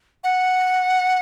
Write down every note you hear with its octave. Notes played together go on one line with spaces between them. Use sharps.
F#5